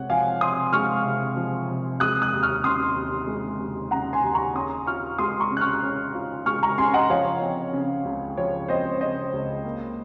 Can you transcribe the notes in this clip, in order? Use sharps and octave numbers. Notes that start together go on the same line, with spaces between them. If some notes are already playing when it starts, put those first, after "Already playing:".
Already playing: C3 G#3 C#5 F#5
F3 F5 G#5
C3 C6 D#6
G#3 C#6 F6
C3
F3
C3
G#3 D#6 F#6
D#6 F#6
D#2
C#6 F6
C#3 C6 D#6
D#2
G#3
D#2
C#3 F#5 A#5
G#5 C6
D#2
A#5 C#6
C#4 C6 D#6
F4 C#6 F6
G#3 C6 D#6
A#5 C#6
C#3
F#6
C#6 F6
C#4
F4
G#3 C#6 F6
A#5 C#6
C#3 G#5 C6
D#5 F#5
F3 C#5 F5
C4
C#3
C#2
F3 C#5
C4 C5 D#5
C#3 C5 D#5
C#2
A#3